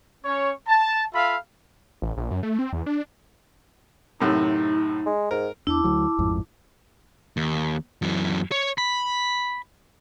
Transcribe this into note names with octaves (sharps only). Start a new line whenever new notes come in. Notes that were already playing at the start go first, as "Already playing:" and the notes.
C#4 C#5
A5
F4 A4 E5 F5 B5
A1
A#1
F#2
A3
C4
E2
D4
F#2 A2 C3 D#4
G#3
G#2 A#4
E2 D4 E4 A5 D6
D2 F#3
A1 F2 G#2
D#2
F#2 E3
C#5
B5